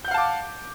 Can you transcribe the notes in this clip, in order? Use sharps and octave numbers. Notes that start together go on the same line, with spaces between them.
F5 F#5 A5 D6 G6